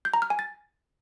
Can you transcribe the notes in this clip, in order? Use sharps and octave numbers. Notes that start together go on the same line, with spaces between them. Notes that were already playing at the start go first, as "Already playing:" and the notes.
G6
A#5
F6
G#5
A6